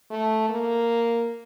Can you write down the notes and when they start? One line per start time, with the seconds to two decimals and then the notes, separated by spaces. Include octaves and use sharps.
0.10 A3
0.49 A#3